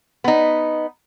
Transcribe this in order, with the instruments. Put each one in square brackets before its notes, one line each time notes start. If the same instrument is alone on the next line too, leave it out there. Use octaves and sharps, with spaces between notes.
[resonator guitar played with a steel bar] B3 D#4